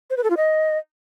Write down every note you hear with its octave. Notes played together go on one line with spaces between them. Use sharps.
C5
B4
A4
F4
D#5